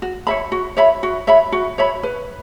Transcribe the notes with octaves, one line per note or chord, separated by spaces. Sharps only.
F#4
C#5 E5 B5
F#4
C#5 E5 B5
F#4
C#5 E5 B5
F#4
C#5 E5 B5
B4